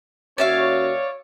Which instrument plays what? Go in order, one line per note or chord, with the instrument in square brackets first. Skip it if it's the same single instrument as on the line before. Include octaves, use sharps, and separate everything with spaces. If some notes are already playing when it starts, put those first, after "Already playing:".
[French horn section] D#2 C#4 F#4 [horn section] C#5 [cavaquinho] D5 E5 F5